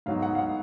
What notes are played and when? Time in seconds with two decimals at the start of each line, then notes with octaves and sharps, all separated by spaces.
0.06 G#2 F#3 B3 D#4 F5
0.22 F#5
0.35 F5
0.39 F#5